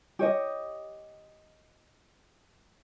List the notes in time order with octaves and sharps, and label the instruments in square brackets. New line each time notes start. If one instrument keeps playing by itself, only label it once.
[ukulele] G4 C#5 D#5